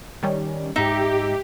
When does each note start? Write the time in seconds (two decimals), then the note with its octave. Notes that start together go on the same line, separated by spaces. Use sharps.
0.23 D#3 G3 C#4
0.76 G#2 D#4 G4 E5